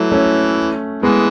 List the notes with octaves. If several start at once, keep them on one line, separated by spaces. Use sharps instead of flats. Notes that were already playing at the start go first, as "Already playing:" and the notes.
Already playing: E3 F#3 A3
A3 C#4
E3 G#3 B3